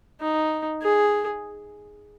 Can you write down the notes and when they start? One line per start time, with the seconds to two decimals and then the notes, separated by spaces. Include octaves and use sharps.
0.22 D#4
0.83 G#4